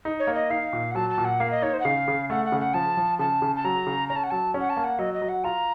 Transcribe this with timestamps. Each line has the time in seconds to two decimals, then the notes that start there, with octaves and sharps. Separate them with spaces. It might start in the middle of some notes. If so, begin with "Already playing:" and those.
0.05 D#4
0.20 C#5
0.27 A#3
0.35 D#5
0.50 D#4 F5
0.73 A#2
0.91 F#5
0.95 F#3 A5
1.10 A5
1.18 A#2
1.25 F#5
1.40 A#3 F5
1.51 D#5
1.62 D#4 C#5
1.74 C5
1.80 F#5
1.85 C#3 F5
2.08 C#3
2.30 A3 F#5
2.45 F#5
2.52 C#3
2.60 F#5
2.74 F3 A5
2.97 F3
3.19 C#3 A5
3.42 C#3
3.56 A5
3.64 F#3 A#5
3.87 C#3
4.09 C#4 A#5
4.16 A5
4.24 F#5
4.31 F#3 A5
4.54 C#4
4.60 F#5
4.70 A5
4.77 A#3
4.84 F#5
4.99 F#3 D#5
5.14 D#5
5.22 F#3
5.29 F#5
5.44 F4 A#5